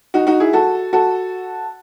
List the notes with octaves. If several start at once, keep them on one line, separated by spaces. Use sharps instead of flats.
D#4 F#4
D#4 F#4
E4 G#4
F#4 A4
F#4 A4